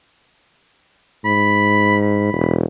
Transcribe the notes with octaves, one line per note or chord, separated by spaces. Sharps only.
G#2 B5
B5
E1